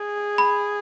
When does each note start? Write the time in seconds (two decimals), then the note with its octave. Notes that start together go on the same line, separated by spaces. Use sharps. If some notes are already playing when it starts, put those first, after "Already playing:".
Already playing: G#4
0.38 B5